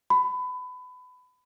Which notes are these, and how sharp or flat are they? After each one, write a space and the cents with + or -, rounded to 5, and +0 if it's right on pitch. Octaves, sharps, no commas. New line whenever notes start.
B5 +25